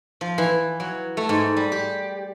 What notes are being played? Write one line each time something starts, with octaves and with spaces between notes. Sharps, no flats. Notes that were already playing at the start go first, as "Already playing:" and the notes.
F3
E3
F#3
A3
G#2
G3
G4